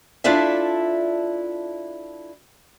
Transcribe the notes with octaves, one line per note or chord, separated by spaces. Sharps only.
D4 E4 F4 A4 D5 E5